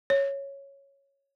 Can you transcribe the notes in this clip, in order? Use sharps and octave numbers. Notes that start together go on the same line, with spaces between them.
C#5